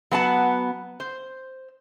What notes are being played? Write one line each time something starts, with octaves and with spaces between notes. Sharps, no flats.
F#3 B3 F#5 A5
C5